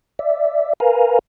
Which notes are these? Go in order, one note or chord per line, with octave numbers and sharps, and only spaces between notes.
D5 E5
A#4 B4 F5 G#5 A#5